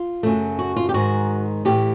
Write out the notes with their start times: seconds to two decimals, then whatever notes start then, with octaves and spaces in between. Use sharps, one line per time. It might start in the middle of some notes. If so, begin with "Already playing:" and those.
Already playing: F4
0.23 F#2 C#3 F#3 A3
0.59 F#4
0.76 F4
0.89 G4
0.94 G#2 D#3 G#3 F#4
1.65 A2 E3 A3 G4